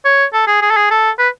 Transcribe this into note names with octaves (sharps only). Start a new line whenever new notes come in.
C#5
A4
G#4
G#4
A4
G#4
A4
B4